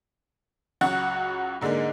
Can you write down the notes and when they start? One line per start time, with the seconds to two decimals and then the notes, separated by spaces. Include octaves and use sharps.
0.81 C#2 F#3 F#4 F#5
1.61 G#2 D3 G#3 A#3 D#4